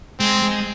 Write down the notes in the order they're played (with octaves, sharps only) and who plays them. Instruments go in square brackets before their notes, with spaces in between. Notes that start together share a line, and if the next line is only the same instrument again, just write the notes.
[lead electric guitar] G#3 [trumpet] C4
[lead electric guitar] G#3